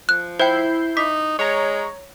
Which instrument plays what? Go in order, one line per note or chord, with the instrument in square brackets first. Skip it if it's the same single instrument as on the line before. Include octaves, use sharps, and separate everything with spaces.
[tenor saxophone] F3 [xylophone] F#6
[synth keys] E4 G6 C7 [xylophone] C5 G5
[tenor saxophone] D#4 [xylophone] D6 B6
[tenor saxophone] G#3 [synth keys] C#5 A#5